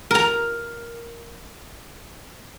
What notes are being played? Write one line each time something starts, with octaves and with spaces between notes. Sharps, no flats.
A#4 A#5